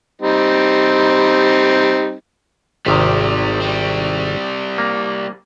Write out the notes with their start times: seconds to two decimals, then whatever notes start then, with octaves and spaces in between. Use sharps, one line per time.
0.22 G3 C4 D#4
2.86 G#1 C3 D#3 G3 C4
3.60 G3 C4
4.78 A#3